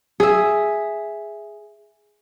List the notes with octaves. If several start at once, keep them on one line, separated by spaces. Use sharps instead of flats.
G#4 E5